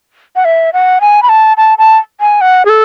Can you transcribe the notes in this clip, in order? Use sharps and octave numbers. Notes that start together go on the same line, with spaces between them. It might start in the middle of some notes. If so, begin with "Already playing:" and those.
F#5
E5
F#5
G#5
B5
A5
A5
A5
G#5
F#5
G#4
A4